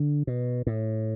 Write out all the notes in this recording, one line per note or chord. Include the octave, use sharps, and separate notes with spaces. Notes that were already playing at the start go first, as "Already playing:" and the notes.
Already playing: D3
B2
A2